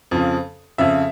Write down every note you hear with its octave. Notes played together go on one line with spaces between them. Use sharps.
F2 C#3 F3
F2 C#3 F3 E5